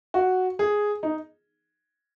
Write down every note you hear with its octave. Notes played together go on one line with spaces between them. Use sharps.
F#4
G#4
D#4